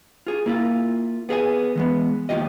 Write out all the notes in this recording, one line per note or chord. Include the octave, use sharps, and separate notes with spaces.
F4 G#4
A#3 E4 F4
B3 G#4 E5 G#5
E3 G#3 B3
D#2 A#2 D#3 F3 G4 D#5